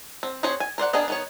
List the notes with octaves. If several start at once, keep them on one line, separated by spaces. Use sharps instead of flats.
C4
C4 F#4 G#4 C5 C#5
G#5
A#4 C5 D5 F#5
B3 D4 G#4 A#4 D#5
D#3 B3 C#5